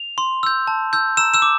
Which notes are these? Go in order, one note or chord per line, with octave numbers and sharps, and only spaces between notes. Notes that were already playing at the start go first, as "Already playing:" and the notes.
Already playing: F7
C6
E6 G6
A5
E6 G6
A#5 E6 E7
E6 E7
D6